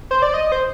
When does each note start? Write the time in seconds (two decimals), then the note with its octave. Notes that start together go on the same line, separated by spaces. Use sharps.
0.11 C5
0.22 D5
0.34 D#5
0.52 C5